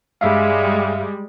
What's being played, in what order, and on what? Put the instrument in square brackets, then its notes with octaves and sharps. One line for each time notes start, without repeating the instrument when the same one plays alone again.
[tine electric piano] G2 E5 F5 [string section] G3 G#3